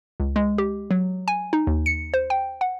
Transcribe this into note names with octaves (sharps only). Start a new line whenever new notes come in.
C#2
G#3
G4
F#3
G#5
D#4
D#2
C#7
C5
G5
F#5